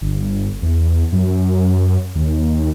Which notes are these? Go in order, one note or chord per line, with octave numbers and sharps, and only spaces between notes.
G1
E2
F#2
D#2